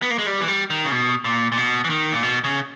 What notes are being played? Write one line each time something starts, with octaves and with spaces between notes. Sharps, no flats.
B3
A#3
G#3
G3
E3
G3
D#3
C#3
B2
A#2
A#2
B2
E3
D#3
A#2
B2
C#3